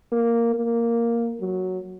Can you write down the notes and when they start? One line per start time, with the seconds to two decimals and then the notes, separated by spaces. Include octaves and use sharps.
0.12 A#3
0.55 A#3
1.40 F#3